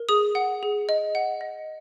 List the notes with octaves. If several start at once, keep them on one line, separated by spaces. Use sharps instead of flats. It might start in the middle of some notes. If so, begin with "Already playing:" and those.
Already playing: A#4
G#4 D#6
F#5
G#4
D#5
F#5
D#5